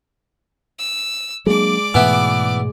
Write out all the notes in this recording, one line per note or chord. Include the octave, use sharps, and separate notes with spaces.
E6
F#3 G#3 A#3 D4 D5 D6
G#2 B2 E3 A3 B3 E4